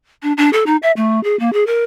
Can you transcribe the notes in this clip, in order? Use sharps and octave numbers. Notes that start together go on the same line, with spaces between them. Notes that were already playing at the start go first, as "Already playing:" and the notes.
D4
D4
A4
D#4
E5
A3
G#4
A#3
G#4
A#4